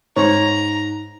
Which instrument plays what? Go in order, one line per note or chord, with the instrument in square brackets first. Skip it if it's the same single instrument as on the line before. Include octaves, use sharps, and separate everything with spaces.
[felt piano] G#2 [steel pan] C5 C#5 [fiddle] A#5